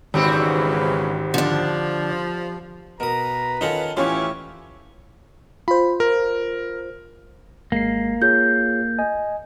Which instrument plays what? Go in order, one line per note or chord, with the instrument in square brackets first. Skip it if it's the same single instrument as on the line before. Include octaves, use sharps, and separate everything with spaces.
[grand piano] G#1 [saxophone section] G#2 C#3 E3 [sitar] G3 C4 F#4
[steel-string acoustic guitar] D3 D4 [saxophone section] F3
[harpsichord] B2 D#6 [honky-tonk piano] A#4 [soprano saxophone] B4 [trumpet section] A#5
[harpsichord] D#3 C#4 F#5 [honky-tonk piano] D#4 F4 A4
[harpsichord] A2 [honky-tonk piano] E3 C#4 F4 [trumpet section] E4 G4 C#6 [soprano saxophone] C#5
[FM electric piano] F4 C5 [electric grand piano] B5
[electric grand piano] A#4
[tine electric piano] G#1 G#3 C7 [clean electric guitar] A#3
[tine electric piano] F4 G#4 C#5 [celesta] G6
[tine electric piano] D#5 G#5